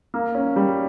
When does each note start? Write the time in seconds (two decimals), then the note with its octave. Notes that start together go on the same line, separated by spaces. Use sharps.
0.14 A#3
0.35 C#4
0.56 G3